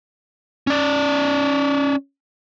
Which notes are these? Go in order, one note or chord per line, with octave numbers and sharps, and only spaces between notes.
C#4 D5